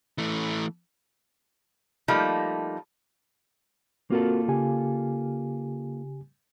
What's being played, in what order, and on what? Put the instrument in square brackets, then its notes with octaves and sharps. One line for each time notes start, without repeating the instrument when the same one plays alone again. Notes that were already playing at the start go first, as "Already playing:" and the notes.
[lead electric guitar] E3 A3
[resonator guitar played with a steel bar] F3 G3 A3 A#3 D#4
[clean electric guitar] A#3 F4 A4 [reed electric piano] C4 F#4 A#4
[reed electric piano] C#3 G4 G#5